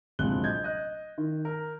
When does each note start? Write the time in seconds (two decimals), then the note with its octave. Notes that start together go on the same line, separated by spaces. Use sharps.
0.19 D1 A#1 C3 G#3 F#6 G7
0.43 D#5 G6 G#6
0.64 D#5 F#6
1.18 D#3
1.45 A#4